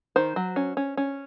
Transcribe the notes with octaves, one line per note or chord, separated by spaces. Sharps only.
D#3 C5
F#3
C#4
C#4
C#4